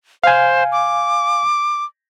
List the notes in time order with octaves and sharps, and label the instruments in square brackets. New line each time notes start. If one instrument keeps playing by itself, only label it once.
[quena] C5 [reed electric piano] F5 G#5
[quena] D6